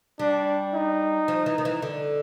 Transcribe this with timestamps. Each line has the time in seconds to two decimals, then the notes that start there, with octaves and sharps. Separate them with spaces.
0.19 G3 D4
0.74 D#4
1.28 F3
1.46 E3
1.58 D#3
1.65 E3
1.82 D3